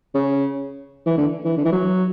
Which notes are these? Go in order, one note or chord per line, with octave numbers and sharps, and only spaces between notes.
C#3
E3
D3
E3
D3
E3
F#3